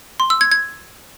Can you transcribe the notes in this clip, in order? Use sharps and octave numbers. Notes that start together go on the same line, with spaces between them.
C6
E6
G#6
G#6